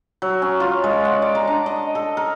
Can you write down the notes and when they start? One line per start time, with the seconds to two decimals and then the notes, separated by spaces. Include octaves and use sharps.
0.22 F#3
0.42 C#4
0.60 F4
0.84 G#3
1.05 F#5
1.22 D5
1.35 A#5
1.47 D4
1.66 D#5
1.95 A4
2.17 A#4